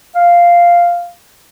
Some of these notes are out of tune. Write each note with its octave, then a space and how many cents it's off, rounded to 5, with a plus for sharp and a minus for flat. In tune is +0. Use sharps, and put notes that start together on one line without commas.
F5 -5